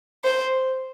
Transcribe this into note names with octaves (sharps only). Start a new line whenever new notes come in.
C5